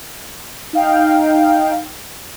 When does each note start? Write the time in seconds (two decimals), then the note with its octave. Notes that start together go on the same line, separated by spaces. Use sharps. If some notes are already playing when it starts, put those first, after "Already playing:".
0.73 D#4 F5 G5